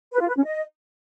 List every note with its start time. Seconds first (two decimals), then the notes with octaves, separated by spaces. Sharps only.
0.12 B4
0.20 F4
0.28 B4
0.36 C#4
0.44 D#5